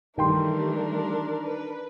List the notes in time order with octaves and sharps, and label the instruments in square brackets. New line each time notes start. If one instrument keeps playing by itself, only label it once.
[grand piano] D#3 G5 C6 [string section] E3 G3 A3 [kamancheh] D4 A#4
[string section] B4